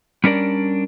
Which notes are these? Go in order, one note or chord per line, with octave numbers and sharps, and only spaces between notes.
G3 C#4 D4 A#4 D5